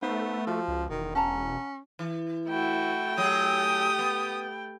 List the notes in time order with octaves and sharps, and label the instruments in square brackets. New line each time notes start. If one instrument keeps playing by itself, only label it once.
[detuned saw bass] A3 [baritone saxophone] B3 [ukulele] D#4 C5 F5
[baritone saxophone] F3 [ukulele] F#4
[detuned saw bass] C#2
[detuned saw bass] E1 [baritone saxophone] D#3
[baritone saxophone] C#4 [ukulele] F#5 A5 A#5
[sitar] E3
[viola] A3 G5 [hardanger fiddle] E4 F#4
[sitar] F#3 G#4 [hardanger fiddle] G4 [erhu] D#6
[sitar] B3